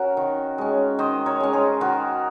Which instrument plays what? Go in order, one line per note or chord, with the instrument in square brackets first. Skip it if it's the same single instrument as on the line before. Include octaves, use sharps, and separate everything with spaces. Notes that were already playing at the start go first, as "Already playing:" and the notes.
Already playing: [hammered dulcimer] C#4 F#4 A#4
D#3
G#3 C#4
D#3 C5 D#5
A#4 C#5
G#3 C#4
G#4 C5
D#3 F#4 A#4